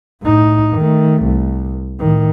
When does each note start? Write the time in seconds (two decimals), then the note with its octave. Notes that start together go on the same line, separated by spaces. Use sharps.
0.21 A2 D#4
0.74 D#3 A3
1.24 C2
1.99 A2 D#3